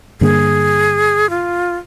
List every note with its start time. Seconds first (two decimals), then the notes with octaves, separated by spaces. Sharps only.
0.21 G2 D3 A#3 G#4
1.30 F4